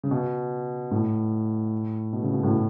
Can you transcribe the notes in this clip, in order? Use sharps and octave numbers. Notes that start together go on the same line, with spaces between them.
C#3
B2
A2
B2
C#3
B2
A2